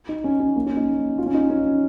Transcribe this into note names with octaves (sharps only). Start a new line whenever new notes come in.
D#4
C#4
C#4
A#3
C#4
D#4
F4
C#4
D#4
C#4